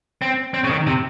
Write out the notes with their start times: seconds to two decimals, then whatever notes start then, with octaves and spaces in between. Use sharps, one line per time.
0.22 C4
0.54 C4
0.64 C#3
0.71 D#3
0.87 C3